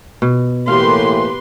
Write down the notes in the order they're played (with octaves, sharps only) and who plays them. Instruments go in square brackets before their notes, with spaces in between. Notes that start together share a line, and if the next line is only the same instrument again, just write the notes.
[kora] B2
[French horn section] A2 E3 A#3 [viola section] G4 B4 C6 [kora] F5